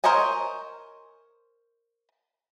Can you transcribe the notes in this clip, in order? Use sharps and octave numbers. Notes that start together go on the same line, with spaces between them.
A#4 C5 C#5 D#5 G#5